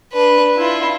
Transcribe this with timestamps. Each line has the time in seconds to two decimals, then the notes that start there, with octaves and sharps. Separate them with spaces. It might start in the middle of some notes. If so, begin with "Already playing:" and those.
0.13 D4 B4
0.57 E4 F4